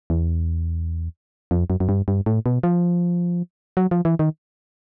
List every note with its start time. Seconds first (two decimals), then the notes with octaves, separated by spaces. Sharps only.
0.10 E2
1.51 F2
1.70 F#2
1.80 F#2
1.89 G2
2.08 G2
2.26 A2
2.46 B2
2.63 F3
3.77 F#3
3.91 F3
4.05 E3
4.19 D#3